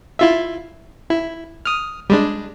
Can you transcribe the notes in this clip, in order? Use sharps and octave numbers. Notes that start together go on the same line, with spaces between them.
E4 F4 E5
E4
D#6 F6
G3 G#3 D4